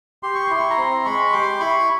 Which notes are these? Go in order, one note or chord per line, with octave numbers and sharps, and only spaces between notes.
G4 C6
C#6
E4 C6
C#6
A#5 C6
C4
G#3 B5 C#6
G4 C6 D6
E4 B5 C#6